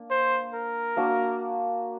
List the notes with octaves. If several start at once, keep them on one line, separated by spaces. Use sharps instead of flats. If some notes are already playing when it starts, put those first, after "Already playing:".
Already playing: A#3 D4
C5
A#4
A#3 D4 F#4